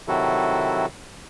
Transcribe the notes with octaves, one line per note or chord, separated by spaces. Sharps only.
C3 D#3 F#3 E4 F#4 A4